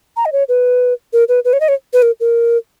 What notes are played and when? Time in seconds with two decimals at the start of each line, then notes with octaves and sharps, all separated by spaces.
0.17 A#5
0.25 D#5
0.32 C#5
0.49 B4
1.13 A#4
1.29 B4
1.45 B4
1.53 C#5
1.60 D#5
1.68 C#5
1.93 B4
2.02 A#4
2.20 A#4